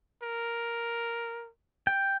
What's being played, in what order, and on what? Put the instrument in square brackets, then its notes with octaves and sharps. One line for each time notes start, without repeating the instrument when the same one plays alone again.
[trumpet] A#4
[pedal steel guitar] G5